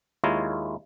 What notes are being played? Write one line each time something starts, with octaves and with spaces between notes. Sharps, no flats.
D#2 G#3 E4 F4 C#5 A#5